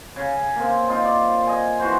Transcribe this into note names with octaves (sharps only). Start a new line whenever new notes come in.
C#3
A#3 C4
C4 D#4 F4
D5
D#5 G#5
E3 F#4 C5